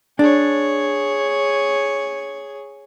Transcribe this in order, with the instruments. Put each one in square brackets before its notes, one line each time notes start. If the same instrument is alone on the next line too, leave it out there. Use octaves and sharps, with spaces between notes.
[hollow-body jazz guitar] D4 [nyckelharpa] G#4 C#5